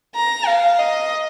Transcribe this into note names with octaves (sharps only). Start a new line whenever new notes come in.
A#5
F5
D#5